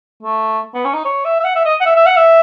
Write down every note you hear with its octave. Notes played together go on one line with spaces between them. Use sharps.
A3
B3
C#4
D#4
C#5
E5
E5
F#5
E5
D#5
F#5
E5
E5
F#5
E5